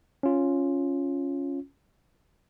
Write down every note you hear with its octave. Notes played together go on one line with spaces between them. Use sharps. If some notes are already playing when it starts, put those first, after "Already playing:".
C#4 F4